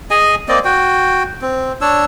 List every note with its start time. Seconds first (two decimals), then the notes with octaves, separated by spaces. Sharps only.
0.11 G#4 D#5 G#5
0.49 A#3 C4 D5 D#5
0.65 F#4 G5
1.42 C4
1.81 D4 C#5 E6